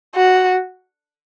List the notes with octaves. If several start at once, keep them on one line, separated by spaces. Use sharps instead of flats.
F#4